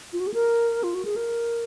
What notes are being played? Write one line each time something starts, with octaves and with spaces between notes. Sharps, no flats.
F4
F#4
G#4
A#4
F4
F#4
G#4
A#4